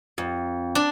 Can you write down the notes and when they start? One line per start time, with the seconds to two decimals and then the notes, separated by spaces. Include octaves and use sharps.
0.18 F2
0.75 D4